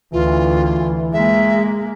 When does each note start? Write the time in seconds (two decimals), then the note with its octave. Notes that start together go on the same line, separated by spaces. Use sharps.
0.13 D2 E3 F4
1.13 G#3 A#3 E5